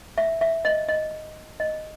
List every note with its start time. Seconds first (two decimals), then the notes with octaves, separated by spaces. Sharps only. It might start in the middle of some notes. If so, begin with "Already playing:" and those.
0.18 E5
0.41 E5
0.65 D#5
0.88 D#5
1.60 D#5